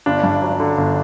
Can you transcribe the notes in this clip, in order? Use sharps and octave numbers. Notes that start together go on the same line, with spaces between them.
G1 D4
G2
F#3
D3
G1